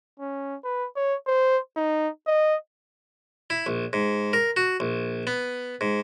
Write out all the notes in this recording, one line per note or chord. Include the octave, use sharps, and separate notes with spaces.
C#4
B4
C#5
C5
D#4
D#5
E4
A#1
G#2
A#4
F#4
A#1
B3
G#2